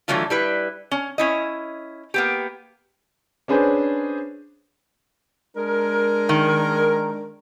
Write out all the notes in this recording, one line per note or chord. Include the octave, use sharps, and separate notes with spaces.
D3 E3 F#3 A3 F4
G3 E4 B4
C#4
C#4 E4 D#5
A#3 B3 G4
C#4 D4 G#4 B4 C5
G#3 D4 A#4
D#3